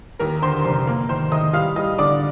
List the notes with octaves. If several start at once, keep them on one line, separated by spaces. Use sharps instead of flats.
D#2 A#4 A#5
D3 C5 C6
F1 C5 C6
A#3
D#3 C5 C6
D#3 D#5 D#6
G3 F5 F6
G3 D#5 D#6
D3 D5 D6